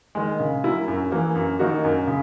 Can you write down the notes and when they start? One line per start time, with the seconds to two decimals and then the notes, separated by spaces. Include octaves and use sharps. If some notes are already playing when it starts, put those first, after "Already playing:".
0.15 D#3 G#3
0.40 C#3
0.64 F#3 A#3 E4
0.88 F#2
1.12 E3 A#3
1.35 F#2
1.59 D#3 A#3 D#4 F#4
1.84 F#2
2.07 C#3